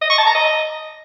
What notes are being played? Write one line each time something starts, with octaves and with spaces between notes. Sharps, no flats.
D#5
C#6
A5
A#5
D#5